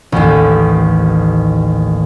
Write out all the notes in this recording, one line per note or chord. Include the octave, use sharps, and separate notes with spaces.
A1 D#2